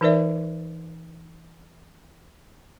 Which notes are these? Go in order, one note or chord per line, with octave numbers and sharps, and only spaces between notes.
E3 D#4 A#4 C5 D5 E5